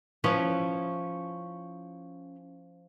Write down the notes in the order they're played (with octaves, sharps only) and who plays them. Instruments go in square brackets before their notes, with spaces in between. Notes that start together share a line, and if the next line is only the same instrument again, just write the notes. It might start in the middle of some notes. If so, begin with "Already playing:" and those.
[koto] F3 [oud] C#4 E4 B4